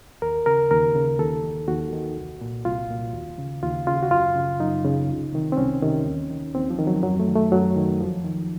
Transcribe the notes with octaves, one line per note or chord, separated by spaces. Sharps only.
D#2 A#4
C#3 A#4
D#2 A#4
C#3
D#2 A4
D#3
D#2 F#4
D#3
C2
A#2
C2 F4
A#2
D#2
C#3
D#2 F4
C#3 F4
F#4
F#2 F4
C#3
F#2 D#4
C#3
C2
C3 D#3
C4
C2 C#4
C3 D#3
D#2
D#3
D#2 C4
F3
D#3
F#3
F#2 F#3
A3
D#3
A3
F#2 F#3
D#3
F2 F3
D#3